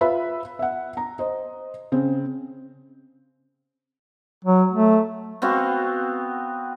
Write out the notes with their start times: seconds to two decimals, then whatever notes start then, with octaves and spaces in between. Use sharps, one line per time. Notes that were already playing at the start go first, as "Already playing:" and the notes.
0.01 F4 B4 E5 B5
0.59 E5 F#5
0.97 A#5
1.19 C5 D#5
1.92 C#3 C4
4.45 F#3
4.72 A3
5.42 B3 C4 F#4 F5